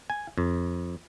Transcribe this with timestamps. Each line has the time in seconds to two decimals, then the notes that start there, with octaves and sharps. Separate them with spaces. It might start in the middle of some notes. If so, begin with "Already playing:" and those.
0.10 G#5
0.38 F2